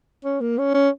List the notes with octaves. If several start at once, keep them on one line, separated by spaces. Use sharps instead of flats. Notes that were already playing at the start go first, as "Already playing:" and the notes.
C#4
A#3
C#4
C#4